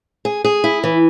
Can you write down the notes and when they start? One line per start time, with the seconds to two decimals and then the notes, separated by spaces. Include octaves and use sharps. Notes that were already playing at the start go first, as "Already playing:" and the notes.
0.25 G#4
0.44 G#4
0.64 E4
0.84 E3